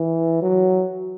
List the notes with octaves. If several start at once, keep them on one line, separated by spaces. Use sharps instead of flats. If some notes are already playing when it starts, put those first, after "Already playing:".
Already playing: E3
F#3